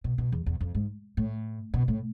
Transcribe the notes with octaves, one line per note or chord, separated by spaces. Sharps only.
B2
B2
E2
E2
F2
G#2
A2
B2
A2